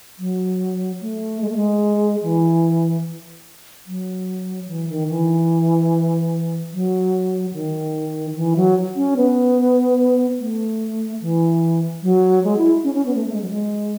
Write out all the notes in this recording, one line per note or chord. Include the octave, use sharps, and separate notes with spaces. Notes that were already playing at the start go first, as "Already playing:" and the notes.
F#3
A3
G#3
A3
G#3
E3
F#3
E3
D#3
E3
F#3
D#3
E3
F#3
C#4
B3
A3
E3
F#3
G#3
E4
C#4
C#4
B3
A3
A3
G#3
F#3
G#3